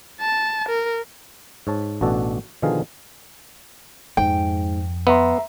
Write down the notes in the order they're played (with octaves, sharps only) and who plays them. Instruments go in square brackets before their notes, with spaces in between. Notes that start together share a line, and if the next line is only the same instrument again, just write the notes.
[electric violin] A5
A#4
[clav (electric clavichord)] G#2 C#5 A5
A1 B2 D4 F#4 A4
B2 D3 D#3 F3 G#4 F5
[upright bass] F2 [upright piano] G#2 [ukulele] G5
[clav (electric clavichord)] B3 [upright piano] E5 A#5 C6